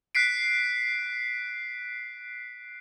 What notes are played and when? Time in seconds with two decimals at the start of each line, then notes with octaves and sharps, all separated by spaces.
0.15 F#6 B6 C7 D7